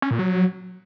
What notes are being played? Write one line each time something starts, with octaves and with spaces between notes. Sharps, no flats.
C#4
A#2
F#3